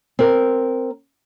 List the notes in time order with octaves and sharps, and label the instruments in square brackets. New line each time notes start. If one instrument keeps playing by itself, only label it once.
[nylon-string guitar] C4 A#4